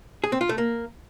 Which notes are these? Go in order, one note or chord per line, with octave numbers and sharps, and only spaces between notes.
G#4
C4
F4
A3
A#3